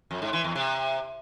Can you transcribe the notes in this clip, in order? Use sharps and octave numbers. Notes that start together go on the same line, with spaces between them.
F2
G#2
E3
E2
C3